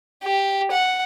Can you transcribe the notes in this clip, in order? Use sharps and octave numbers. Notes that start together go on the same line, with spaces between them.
G4
F#5